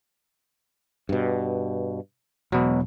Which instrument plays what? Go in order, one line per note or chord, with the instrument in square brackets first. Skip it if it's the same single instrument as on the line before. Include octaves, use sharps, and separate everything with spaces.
[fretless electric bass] G2 B2
[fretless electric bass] E1 [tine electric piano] B2 F#3